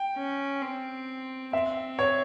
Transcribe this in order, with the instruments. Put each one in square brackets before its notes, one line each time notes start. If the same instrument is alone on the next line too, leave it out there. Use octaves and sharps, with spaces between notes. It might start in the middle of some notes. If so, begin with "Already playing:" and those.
Already playing: [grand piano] G5
[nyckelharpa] C#4
C4
[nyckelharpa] C4 [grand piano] E5
[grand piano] C#5